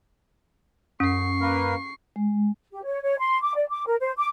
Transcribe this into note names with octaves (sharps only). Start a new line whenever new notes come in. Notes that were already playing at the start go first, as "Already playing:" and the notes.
F#2 C#4 C#6 C7
A#3 A#4 B4
G#3
G4
C#5
C#5
C6
D6
D5
D6
A#4
C5
D6